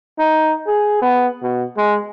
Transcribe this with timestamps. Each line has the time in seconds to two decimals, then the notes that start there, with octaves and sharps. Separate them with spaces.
0.19 D#4
0.67 G#4
1.02 B3
1.42 B2
1.77 G#3